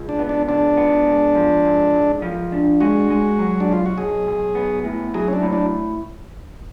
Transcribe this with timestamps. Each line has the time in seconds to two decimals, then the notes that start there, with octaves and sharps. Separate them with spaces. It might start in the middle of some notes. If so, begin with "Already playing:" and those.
Already playing: C#2
0.09 D4
0.19 B3
0.29 D4
0.48 C#2 D4
0.77 B3
1.07 G#2
1.35 F3
1.65 G#2
1.94 G#2
2.22 F3
2.52 D4
2.80 G#3 F#4
3.10 G#3
3.39 F#3
3.60 D4
3.69 B1 F4
3.86 F#4
3.98 B1 G#4
4.27 B1
4.55 B3
4.84 A2
5.14 F#3 G#4
5.28 C#4
5.33 D4
5.43 A2
5.53 D4